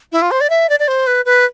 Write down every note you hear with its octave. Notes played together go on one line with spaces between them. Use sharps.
E4
F4
C5
D5
E5
D5
D5
C5
B4
B4